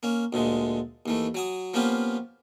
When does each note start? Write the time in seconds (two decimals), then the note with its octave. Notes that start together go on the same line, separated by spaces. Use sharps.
0.03 A#3 C#4
0.33 D2 A#2 D3 G#3
1.06 D#2 E3 A3
1.35 F#3 G#5 D#6
1.74 F3 A#3 B3 C#4 F4 G4